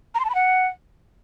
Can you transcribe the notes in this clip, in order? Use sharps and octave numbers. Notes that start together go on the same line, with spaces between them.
A#5
C6
A5
B5
F#5